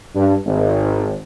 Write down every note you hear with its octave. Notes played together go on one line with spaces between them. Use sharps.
G2
G#1